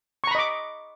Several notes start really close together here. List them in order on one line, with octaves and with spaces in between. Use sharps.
C#6 A#5 B5 D#5 D6